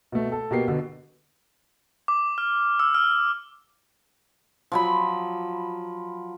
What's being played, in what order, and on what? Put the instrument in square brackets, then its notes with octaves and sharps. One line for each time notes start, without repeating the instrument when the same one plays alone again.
[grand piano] B2 A3
A4
B2 A#3 G4 C7
B2 D3
[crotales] D6
F6
E6
F6
[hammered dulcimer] F3 F#3 B5